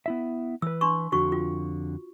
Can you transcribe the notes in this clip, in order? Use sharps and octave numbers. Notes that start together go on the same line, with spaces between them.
B3 E4 E5
E3 B4 E6
D4 C6 C#6
F2 D3 F#4 C#6
F4